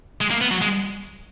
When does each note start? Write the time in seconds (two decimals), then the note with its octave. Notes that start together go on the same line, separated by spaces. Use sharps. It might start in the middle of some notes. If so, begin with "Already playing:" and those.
0.21 G#3
0.31 A#3
0.41 B3
0.51 F#3
0.62 G#3